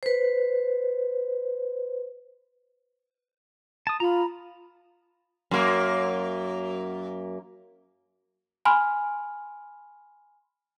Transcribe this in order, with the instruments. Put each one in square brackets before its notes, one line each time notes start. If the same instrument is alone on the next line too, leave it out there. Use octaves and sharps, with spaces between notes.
[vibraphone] B4 C5
[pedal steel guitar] A5 D#6
[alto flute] F4 [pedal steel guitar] A#5 B5
[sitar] F#2 A#3
[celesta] G#5 B5 C6 F6